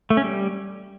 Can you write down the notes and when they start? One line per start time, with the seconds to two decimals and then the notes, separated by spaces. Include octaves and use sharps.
0.10 A3
0.17 C#4
0.24 G3